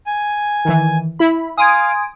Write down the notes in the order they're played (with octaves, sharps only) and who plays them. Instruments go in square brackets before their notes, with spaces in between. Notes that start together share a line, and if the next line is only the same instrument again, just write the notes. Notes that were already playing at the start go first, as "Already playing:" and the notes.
[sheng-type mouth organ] G#5
[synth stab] D#3 E3
E4 B5
[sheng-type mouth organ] F5 [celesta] G#5 C6 G#6 [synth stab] D#6 D7